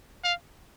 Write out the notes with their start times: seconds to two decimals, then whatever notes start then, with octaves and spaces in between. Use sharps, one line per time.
0.24 F5